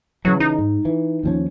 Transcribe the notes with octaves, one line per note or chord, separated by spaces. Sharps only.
C#3 E3 F#3
D#4
G#2
E3
D#2 F3 C#4